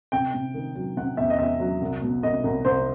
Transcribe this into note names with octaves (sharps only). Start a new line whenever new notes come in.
C3 G5
C3
D#3
F#3
C3 F#5
E2 E5
D#5
E2 E5
F#3
C2
B2
C2 D#5
C2
C2 C5